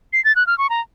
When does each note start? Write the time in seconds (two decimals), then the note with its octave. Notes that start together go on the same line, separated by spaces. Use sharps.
0.13 C7
0.25 A6
0.36 F#6
0.47 F6
0.58 C#6
0.70 A#5